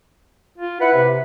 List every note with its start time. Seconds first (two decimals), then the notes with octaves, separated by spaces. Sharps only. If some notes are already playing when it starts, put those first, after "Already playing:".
0.58 F4
0.80 E4 B4 F#5
0.94 C3